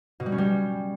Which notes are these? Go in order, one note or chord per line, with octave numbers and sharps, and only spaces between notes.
B2
G3
C#4
G3